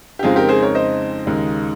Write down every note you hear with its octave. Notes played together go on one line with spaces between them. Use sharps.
G4
F2 C#3 G#3 C4 D#4 F4 G#4
G4 A#4
G#4 C5
A#4 C#5
C5 D#5
D#2 C#3 G#3 D#4